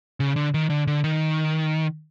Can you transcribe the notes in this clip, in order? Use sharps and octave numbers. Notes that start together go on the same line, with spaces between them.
C#3
D3
D#3
D3
D3
D#3